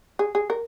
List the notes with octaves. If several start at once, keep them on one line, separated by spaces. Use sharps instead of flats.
G#4
G#4
A#4